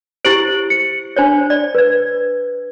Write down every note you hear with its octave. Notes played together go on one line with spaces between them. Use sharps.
E4 G4 C5 D7 F#7
C#7
D4 C5 C#5
D5
B4 G#6